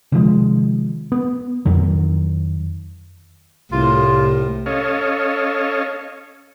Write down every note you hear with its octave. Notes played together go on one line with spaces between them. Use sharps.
C3 D#3 F3 G#3
B3
F2 D#3 F#3
C2 A2 F4
C#4 A4 C#5 D#5 F5